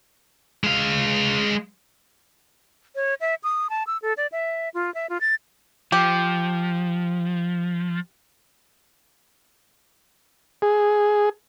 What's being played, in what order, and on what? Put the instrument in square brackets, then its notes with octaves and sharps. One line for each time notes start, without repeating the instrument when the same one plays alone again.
[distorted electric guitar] G#3 F5
[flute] C#5
E5
D#6
A5
E6
A4
D5
E5
F4
E5
F4
A6
[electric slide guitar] F3 [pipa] G4
[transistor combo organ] G#4